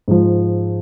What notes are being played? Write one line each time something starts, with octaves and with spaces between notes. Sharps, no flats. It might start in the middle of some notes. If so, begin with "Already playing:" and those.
G#2 F3